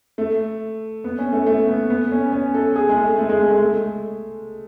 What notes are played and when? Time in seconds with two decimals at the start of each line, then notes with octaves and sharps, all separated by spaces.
0.18 A3
1.04 B3
1.18 C#4
1.32 A3
1.47 A3
1.68 B3
1.90 B3
2.12 C#4
2.33 C#4
2.54 A4
2.76 G#4
2.89 G#3
2.96 A3
3.18 A3
3.29 G#3
3.40 A3
3.50 G#3
3.61 A3